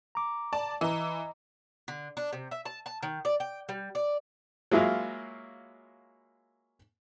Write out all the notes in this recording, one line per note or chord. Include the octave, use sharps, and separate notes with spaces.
A#5 D6
D5 A5
E3 D#5 A#5
D3
D4
C3
E5
A5
A5
D#3
D5
G5
G3
D5
F#3 G#3 A#3 E4 F4